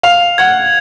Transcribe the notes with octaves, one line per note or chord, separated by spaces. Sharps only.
F5 F7
F#5 G#6